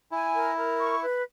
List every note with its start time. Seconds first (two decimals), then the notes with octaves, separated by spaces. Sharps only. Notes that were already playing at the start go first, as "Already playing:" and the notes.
0.11 E4 G#5
0.35 A#4
0.56 A#4
0.79 C#6
1.01 B4